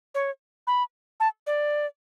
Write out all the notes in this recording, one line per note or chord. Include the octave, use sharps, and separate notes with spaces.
C#5
B5
A5
D5